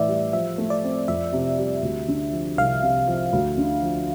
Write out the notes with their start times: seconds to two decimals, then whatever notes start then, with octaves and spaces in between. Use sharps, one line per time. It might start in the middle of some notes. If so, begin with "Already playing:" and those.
Already playing: A2 E3 D5 E5
0.08 G3
0.33 F3 E5
0.58 A3
0.70 D5
0.84 C4
1.08 F2 E5
1.33 C3
1.59 G3
1.83 D2
2.08 D3
2.32 F3
2.57 C2 F5
2.82 C3
3.08 F3
3.33 D2
3.58 D3
3.82 F3